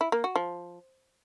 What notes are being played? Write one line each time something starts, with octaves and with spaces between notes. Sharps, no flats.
E4
A#3
F#4
F3